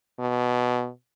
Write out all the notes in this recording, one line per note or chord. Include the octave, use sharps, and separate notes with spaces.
B2